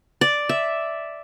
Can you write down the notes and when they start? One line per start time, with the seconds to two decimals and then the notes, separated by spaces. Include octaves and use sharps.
0.21 D5
0.49 E5